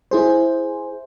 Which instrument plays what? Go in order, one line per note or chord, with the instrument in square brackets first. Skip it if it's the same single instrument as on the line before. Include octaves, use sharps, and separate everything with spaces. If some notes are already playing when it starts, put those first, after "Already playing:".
[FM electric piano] E4 G#4 C5